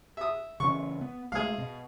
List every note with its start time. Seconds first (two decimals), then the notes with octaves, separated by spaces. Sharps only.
0.17 E5 D#6
0.60 C#3 E3 C#4 C#6
1.01 B3
1.32 B1 G#3 A3 G#4 F5
1.58 B2